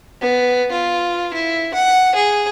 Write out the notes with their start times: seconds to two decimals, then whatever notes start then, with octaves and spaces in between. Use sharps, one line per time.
0.22 B3
0.71 F4
1.34 E4
1.74 F#5
2.15 G#4